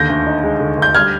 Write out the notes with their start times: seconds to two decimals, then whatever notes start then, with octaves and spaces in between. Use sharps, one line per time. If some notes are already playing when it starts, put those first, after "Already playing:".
Already playing: D#2 D3 G6 A#6
0.09 D2
0.26 D#4
0.44 G#3
0.60 D3
0.77 D2 G6
0.95 G3 F6 G#6